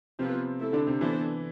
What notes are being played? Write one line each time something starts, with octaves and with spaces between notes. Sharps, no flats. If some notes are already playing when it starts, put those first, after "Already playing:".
C3 F3 B3 C4 F4 B4
A3 E4 A4
D3 D4
C3 C4
E3 B3 D4 E4 A4 C5